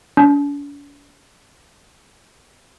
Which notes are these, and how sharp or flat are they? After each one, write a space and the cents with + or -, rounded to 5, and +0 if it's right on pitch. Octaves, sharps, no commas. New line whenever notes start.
D4 -45